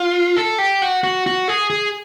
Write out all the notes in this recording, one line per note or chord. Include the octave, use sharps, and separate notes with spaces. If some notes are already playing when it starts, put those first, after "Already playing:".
Already playing: F4
A4
G4
F#4
F#4
F#4
G#4
G#4